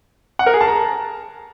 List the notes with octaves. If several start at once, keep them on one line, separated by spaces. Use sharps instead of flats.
F#5
A#4
G#4
A5
A#5